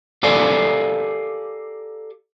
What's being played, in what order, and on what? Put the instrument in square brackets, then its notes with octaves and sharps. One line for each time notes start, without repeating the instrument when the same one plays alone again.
[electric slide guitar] G4 A4 A#4 D5 F5 G#5